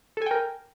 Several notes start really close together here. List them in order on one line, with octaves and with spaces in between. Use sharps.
A4 G#5 G5 A#4